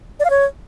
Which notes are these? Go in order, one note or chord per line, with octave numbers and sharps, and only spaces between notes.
D5
F5
C#5